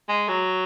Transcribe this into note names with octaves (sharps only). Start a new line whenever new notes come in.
G#3
F#3